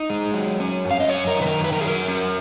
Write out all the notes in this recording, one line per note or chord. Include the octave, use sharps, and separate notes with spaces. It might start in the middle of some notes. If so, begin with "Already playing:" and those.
Already playing: D#4
G#3
F#3
C#4
F#2
F5
D#5
F#2 C#5
A#4
D#3
B4
A#4
F#2
B4
A#4
G#4
F#3 A#4
C#4